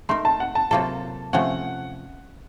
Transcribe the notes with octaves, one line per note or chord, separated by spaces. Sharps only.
A3 D#4 A#4 C6
A5
F#5
A5
C3 F#3 A#3 F4 A4 A5
C3 F3 A3 C#4 F#5